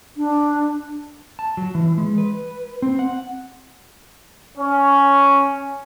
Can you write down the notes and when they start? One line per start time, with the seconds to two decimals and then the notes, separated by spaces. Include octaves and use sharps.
0.17 D4
1.39 A5
1.57 F#3
1.75 E3
1.98 G#3
2.18 B4
2.82 C4
2.99 F#5
4.57 C#4